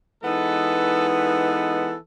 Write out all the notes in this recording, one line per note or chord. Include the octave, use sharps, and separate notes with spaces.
E3 G#3 B3 D#4 A4
A4